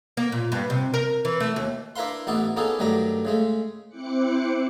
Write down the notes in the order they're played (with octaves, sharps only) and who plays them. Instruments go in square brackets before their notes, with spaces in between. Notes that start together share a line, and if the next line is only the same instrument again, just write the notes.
[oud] A#3
A#2
G2
C3
A#4
E3
A3
D#2
[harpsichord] D4 E4 A#4 B4 F5 C6
A1 B3 D#4 E4 D5 F#5
A#3 B3 C#4 D#4 G#4 A4
G2 D#3 F#3 A3 D4 A#5
C#3 G#3 A3
[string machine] C4 E4 C5 D6 F#6 C#7